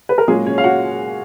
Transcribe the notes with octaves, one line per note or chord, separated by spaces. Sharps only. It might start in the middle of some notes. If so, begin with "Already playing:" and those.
B4
A#4
A#2 F#3 G#3 A#3 C#4 G#4
C#4 C#5
F5
F#4 F#5